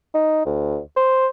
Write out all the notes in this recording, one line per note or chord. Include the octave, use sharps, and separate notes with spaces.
D#4
D2
C5